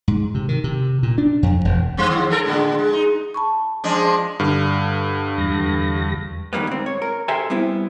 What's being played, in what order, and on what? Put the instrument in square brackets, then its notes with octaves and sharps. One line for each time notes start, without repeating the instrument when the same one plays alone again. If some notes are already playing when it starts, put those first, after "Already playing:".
[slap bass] G#2
C3
D#3
C3
A#2
D4
F2
E1
[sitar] G#2 G3 C4
D#2 D#3
G#3 A4 A#4
A2 D3 G#3
G#3
D#4
[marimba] A5 B5 C#6
[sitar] F3 G#3 D4
[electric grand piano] G2 D3 F6
[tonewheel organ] E2 G3 A#6
[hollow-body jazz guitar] D#3 F#3 G3 A#3 B3
G#2 C4
C#5
A#4
G4 A4 A#4 C5 E5 G#5
G3 B3 C4 E4